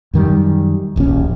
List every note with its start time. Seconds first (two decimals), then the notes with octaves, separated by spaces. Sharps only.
0.13 F#2 D#3 G3
0.96 D1 A#1 D#2 C#4